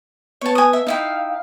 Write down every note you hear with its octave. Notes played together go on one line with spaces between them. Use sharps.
B3 C#5 A5
G#5 D#6
E5
D#4 E4 F5 G5
F5